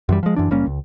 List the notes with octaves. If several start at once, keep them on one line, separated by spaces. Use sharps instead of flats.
F#2 E3 G3
F3 G#3
F#2 E3 D4
F#1 G3 A#3 C#4
C#2